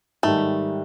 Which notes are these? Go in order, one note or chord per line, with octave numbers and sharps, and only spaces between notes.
G#2 D#3 G3 A3